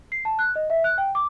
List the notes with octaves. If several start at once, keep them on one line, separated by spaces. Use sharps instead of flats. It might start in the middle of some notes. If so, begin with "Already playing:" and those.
C7
A5
F#6
D#5
E5
F#6
G5
D6